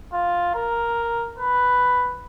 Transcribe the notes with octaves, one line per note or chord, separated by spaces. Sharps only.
F4
A#4
B4